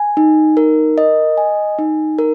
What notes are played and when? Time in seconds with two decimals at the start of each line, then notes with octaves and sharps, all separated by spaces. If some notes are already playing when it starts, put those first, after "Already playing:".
Already playing: G#5
0.17 D#4
0.57 A#4
0.98 D#5
1.37 G#5
1.79 D#4
2.19 A#4